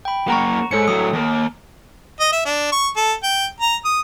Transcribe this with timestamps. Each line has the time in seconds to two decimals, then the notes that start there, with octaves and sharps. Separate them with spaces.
0.05 G5 B5
0.28 F#2 A#3 F#5 A#5 C#6
0.71 G#2 A4 C#5 C#7
0.88 A2 F#3 D#6
1.13 D#2 A#3
2.20 D#5
2.32 E5
2.45 D4
2.72 C#6
2.96 A4
3.23 G5
3.60 A#5
3.85 D#6